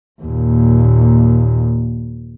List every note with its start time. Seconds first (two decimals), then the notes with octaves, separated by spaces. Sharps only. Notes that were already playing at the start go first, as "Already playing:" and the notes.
0.22 D#2 A#2